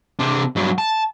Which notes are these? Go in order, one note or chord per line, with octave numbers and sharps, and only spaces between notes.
C3 D4
G2 F#3
A5